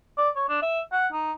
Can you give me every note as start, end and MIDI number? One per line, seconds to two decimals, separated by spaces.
0.18 0.30 74
0.36 0.45 73
0.49 0.59 62
0.62 0.81 76
0.92 1.08 78
1.13 1.32 63